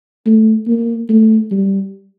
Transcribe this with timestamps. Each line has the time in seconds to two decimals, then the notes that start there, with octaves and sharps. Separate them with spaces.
0.26 A3
0.67 A#3
1.09 A3
1.51 G3